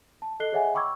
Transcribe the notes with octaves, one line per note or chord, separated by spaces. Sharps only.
A5
A4 D#5 F#6 C7 G7
G#4 C#5 D#5 E5 F#5 G#5
G5 B5 C#6 D6 E6 G#6